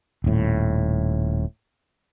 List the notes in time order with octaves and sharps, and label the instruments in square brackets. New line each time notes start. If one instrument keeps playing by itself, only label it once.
[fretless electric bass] D#1 A2